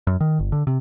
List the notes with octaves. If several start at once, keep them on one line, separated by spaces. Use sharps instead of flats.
F#2
D#3
G1
D3
C3